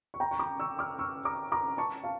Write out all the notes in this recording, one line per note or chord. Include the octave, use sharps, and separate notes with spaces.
C#6
G5 A#5
C#6
A#5 D6
C#6 E6
D6 F6
C#6 E6
A#5 D6
A#5 D6
A5 C#6
F5 A5